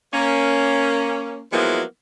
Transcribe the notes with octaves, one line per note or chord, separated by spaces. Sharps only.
A#3 C#4
F3 F#3 G#3 A#3 B3 E4